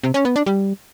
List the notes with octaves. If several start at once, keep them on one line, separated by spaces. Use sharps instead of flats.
C3
C#4
B3
D4
G3